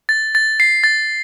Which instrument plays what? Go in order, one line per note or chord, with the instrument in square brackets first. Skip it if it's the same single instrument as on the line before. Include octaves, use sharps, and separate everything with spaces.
[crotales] A6
A6
C7
A6